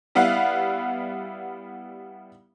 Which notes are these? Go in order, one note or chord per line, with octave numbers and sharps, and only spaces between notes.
G3 B3 E4 F5 F#5